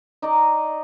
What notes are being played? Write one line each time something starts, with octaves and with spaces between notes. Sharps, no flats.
D#4 D5 D#5